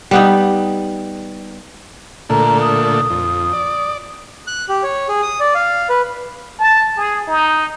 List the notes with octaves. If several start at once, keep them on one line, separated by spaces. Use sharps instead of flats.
G3 B3 D#4
A#2 D3 A3 A#5
D#6
F2
D5
F#6
G4
C#5
G#4
D#6
D5
F5
B4
A5
G#4
D#4